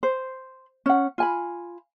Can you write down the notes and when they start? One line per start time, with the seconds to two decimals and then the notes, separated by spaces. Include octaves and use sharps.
0.03 C5
0.86 C#4 F#5
1.18 F4 G#5 B5